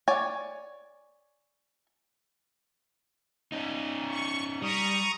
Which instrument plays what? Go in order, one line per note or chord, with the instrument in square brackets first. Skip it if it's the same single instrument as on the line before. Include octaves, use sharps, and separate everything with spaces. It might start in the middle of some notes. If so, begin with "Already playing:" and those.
[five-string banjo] C#5 D5 G#5
[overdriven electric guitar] C#4 D#4
[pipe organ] C#6
[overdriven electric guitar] G3 [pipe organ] A#5 C#6 D#6